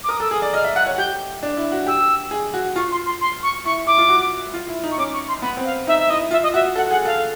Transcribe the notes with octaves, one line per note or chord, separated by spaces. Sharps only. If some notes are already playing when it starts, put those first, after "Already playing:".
D6
A#4 D#6
A4 E6
G#4 D#6
D5
D#5 F6
E5
F#5 F#6
C#5
G4 G6
D4
E4
F#4
G4 E6
G#4
F#4
F4 C#6
C6
C6
C6
C#6
E4 C#6
E4 D6
F4
F#4
F4
E4
D#4
C#6
C#4 D6
C#6
C6
B3 B5
C4
F5
D#4 E5
E5
E4 D#5
F4 E5
D#5
F#4 E5
A4 F#5
G#4 F#5
A4 F5